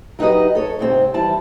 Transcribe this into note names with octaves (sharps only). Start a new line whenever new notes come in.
F#3 D#4 G4 B4 D#5
A4 C#5
G#2 C3 C4
E3 G3 A5